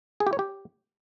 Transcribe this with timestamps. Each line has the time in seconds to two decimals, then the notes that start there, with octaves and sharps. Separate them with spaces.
0.20 G#4
0.27 G4
0.33 C#5
0.39 G4